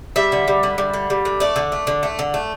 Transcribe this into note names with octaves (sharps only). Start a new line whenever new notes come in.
G3 E5
D3
G3
D3
G3
D3
G3
D3
A3 D5
D3
A3
D3
A3
D3
A3